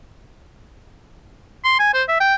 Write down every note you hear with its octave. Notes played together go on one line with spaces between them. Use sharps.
C6
G#5
C5
E5
G5